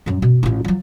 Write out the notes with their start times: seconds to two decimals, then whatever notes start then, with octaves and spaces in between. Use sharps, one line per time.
0.06 F#2 F#3
0.22 B2
0.43 A1 F4
0.65 F3 F#3